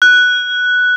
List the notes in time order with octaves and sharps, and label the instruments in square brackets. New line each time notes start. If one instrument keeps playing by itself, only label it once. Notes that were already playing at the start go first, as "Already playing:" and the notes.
[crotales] F#6